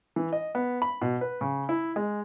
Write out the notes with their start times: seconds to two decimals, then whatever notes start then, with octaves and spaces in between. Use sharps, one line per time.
0.16 E3
0.33 D#5
0.55 B3
0.82 B5
1.02 B2
1.21 B4
1.41 C#3
1.69 E4
1.96 G#3